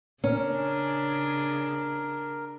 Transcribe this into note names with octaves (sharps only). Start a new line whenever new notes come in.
C#3 C#4 D4 A#4